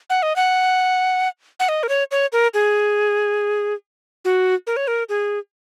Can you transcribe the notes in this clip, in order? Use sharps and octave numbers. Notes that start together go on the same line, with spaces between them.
F#5
D#5
F#5
F#5
D#5
A#4
C#5
C#5
A#4
G#4
F#4
A#4
C#5
A#4
G#4